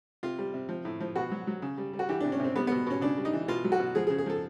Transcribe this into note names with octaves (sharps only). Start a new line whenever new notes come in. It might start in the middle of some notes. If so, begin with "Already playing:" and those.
C3 F4
G3
C3
F3
A2
F3
B2 F#4
F#3
F#3
C#3
G3
G3
F#4
E3 G4
D4
C3
C#4
C3 C4
G3 B3
B3
B2
B2 C#4
C#3 D4
G3
D#4
E3
B2 F4
F#3
F#4
B2
F3 G#4
G#4
C#3
G#4
F3 A4